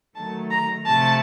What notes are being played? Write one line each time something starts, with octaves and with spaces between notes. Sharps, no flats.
D#3 F#3 A3 A5
A#5
C3 F3 A3 A5